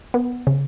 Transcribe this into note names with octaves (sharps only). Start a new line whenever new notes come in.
B3
C#3